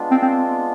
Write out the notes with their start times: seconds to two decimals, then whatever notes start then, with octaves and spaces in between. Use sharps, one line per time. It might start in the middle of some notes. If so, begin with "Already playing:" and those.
Already playing: G#3 B3 D4 F4
0.11 C4
0.22 C4